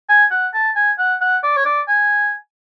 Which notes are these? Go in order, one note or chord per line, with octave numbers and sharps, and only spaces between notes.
G#5
F#5
A5
G#5
F#5
F#5
D5
C#5
D5
G#5